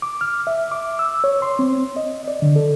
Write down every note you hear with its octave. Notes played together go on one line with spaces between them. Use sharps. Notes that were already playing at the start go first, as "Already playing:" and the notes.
D6
F6
E5
D6
E6
C#5
C6
C4
D#5
D5
D3
A4